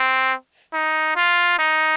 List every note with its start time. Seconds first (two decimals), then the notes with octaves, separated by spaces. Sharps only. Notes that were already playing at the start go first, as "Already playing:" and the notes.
Already playing: C4
0.73 D#4
1.16 F4
1.59 D#4